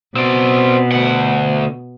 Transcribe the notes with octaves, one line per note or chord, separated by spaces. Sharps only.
B2 C4 D5
D2 F#5